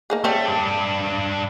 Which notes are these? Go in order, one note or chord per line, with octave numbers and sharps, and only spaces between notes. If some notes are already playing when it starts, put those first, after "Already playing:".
A#3 D#4 G#4
G3 A3 C4 C#4
G2 D4